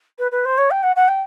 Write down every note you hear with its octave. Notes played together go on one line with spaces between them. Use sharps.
B4
B4
C5
C#5
G5
F#5
F#5
G5